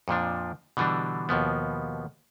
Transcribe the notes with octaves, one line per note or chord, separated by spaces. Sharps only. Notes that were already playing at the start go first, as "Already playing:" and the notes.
F2 A#2 F3 D4
B2 D3 E3 G3 D4
D#2 B2 F3 B3